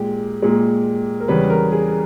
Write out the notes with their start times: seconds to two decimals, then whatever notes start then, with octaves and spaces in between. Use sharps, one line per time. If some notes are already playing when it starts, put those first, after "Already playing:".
Already playing: A#2 G#3 G4
0.42 A#2 G#3
1.20 A#4
1.28 E2 C#3 G3 B4
1.50 A#4
1.72 G#4